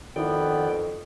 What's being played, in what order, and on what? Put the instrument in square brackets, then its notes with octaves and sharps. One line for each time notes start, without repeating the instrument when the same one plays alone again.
[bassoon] F2 [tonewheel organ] D#3 D5 G5 [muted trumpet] B3 [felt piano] D#4 E4 F#4